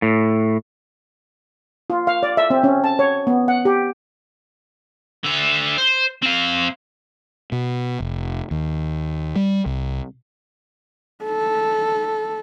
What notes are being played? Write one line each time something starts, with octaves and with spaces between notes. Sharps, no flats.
A2
F4
F5
D5
E5
C4
C#4
A5
C#5
B3
F#5
G4
D3 E5
C5
C4 F5
B2
F1
D#2
G3
C2
A4